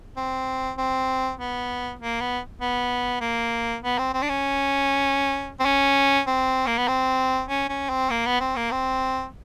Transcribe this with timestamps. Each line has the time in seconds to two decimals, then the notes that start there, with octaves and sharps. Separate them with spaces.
0.17 C4
0.78 C4
1.38 B3
1.99 A#3
2.20 B3
2.61 B3
3.21 A#3
3.83 B3
3.98 C4
4.14 C4
4.22 D4
4.29 C#4
5.60 C4
5.65 C#4
6.27 C4
6.66 A#3
6.78 B3
6.88 C4
7.49 C#4
7.69 C#4
7.90 C4
8.10 A#3
8.26 B3
8.40 C4
8.56 A#3
8.71 C4